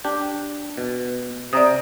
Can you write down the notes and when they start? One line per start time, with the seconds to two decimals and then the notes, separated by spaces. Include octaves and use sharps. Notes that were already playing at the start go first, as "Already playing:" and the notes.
0.05 D4 G4
0.78 B2
1.53 C3 D5 A#5 D#6